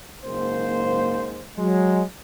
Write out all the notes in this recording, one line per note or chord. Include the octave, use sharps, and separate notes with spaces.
F#1 G#2 A#3 C5
F#3 G#3